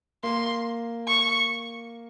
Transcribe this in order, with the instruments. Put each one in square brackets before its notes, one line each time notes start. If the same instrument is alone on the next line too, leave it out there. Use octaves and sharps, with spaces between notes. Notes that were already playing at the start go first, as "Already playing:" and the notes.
[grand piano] A#3 [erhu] C6
[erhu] C#6